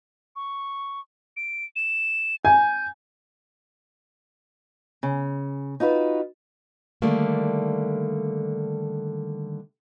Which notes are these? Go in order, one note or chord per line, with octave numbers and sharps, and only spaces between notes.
C#6
D7
E7
G#5 G6
C#3
D#4 F4 F#4 B4
D3 D#3 G3 A3 A#3